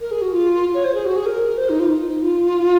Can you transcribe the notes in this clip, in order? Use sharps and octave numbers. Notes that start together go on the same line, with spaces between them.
A#4
G#4
F#4
F4
C#5
C5
G#4
F#4
G#4
A#4
C5
D#4
F4
D#4
F4